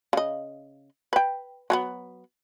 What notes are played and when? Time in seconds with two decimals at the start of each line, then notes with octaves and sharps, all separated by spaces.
0.13 C#3 D#5
1.13 B4 G5
1.70 F#3 A3 B3